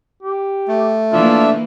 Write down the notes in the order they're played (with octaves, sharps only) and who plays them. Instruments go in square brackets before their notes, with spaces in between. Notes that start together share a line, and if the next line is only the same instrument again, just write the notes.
[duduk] G4
[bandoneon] A3
[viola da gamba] E3 A#3 [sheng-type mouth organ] D4 E5 [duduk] F4